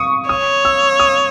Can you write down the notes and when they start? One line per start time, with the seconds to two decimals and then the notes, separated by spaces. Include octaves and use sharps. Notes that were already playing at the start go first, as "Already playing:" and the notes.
Already playing: C#6 D#6
0.29 C#5 D#6
0.65 E6
1.00 D#6